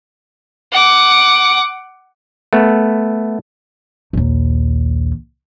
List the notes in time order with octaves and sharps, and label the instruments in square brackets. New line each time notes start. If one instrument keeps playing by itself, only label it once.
[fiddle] F#5 D6
[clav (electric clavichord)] A3 B3
[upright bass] A#1 D#2